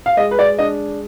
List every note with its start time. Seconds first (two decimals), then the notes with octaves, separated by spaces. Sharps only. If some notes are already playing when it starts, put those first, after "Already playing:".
0.06 F5
0.17 G#3 D#5
0.31 B4
0.39 D5
0.59 D4 D#5